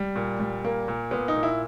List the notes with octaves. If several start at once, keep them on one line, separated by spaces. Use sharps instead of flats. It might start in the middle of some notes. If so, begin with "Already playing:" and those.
Already playing: G3
A#2
G3
A#2 A#3
A#2
A#2 B3
D#4
A#2
E4